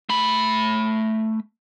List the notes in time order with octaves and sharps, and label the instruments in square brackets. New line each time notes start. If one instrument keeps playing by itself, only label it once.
[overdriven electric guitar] A3 B5